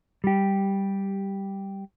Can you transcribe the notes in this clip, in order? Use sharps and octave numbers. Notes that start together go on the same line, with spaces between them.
G3 G4